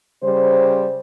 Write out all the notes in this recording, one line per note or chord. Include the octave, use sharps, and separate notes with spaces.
C#3 G3 C5